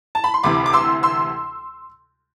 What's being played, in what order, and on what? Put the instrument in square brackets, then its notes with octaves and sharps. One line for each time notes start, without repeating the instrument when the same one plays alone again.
[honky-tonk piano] A5
B5
C6
D2 C3 E3 B5 D6
D6
C6 E6
C6 E6